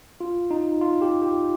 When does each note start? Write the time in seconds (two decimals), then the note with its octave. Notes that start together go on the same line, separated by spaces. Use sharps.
0.20 F4
0.51 D#4
0.81 F4
1.02 G4
1.22 G4